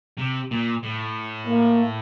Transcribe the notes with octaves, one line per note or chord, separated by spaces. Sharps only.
C3
A#2
A2
A#3